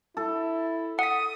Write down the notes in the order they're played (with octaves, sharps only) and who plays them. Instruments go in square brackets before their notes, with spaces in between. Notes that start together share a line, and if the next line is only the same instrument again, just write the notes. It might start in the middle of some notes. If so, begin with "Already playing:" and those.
[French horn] E4 [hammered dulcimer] A4
[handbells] F#5 B6 [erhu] D#6